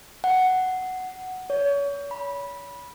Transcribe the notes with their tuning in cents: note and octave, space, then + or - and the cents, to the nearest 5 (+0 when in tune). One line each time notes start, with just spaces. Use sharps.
F#5 +5
C#5 +35
B5 -15